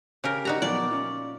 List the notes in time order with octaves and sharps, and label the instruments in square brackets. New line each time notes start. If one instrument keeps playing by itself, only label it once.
[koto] C#3 G4 A#4
[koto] D#4 F#4 A#5 [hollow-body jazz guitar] G4 D5
[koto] A#2 [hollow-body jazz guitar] F3 F#3 B3 [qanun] D5
[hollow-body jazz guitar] C#4 F4